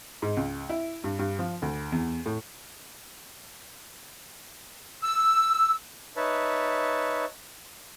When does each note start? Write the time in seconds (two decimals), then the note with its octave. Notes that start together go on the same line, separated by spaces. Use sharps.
0.22 G#2
0.37 C#2
0.69 E4
1.04 G2
1.19 G2
1.39 F3
1.62 D2
1.92 E2
2.26 A2
5.02 E6
6.17 D#4 B4 C#5 E5 A5